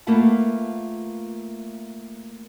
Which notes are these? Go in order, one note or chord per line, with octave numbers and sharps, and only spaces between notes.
A3 A#3 F4 B4 F#5 A5